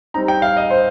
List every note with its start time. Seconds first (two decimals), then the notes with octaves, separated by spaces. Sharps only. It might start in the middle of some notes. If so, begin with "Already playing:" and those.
0.14 G3 C4 D#4 A#5
0.28 G5
0.42 F5
0.57 D#5
0.70 C5